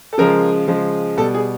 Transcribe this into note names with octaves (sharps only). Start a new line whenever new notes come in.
A4
C#3 F3 G#3 A#4
C#3 F3 G#3
B2 G3 A4
G#4